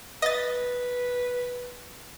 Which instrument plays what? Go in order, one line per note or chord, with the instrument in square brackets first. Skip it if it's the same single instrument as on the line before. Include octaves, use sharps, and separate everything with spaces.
[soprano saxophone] B4 [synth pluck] D#5 A6